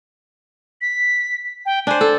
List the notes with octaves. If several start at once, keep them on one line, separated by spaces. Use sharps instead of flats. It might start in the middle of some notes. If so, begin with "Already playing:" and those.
B6
G5
D4 C5 G#5
A4